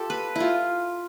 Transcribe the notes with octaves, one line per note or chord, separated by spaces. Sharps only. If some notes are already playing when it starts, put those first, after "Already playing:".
Already playing: F4 G4 A4
B4
E4 F4